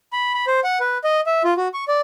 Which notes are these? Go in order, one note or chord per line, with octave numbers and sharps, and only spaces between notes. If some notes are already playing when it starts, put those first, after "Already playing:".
B5
B5
C5
F#5
B4
D#5
E5
F4
F#4
C#6
D5